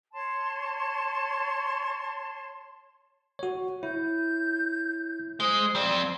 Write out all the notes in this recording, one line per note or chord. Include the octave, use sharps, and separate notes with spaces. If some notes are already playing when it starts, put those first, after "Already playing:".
C#5 A5 C6
F#4 C#5
E4 C#5 G6
G#3 C5 D#6
F2 C4 D5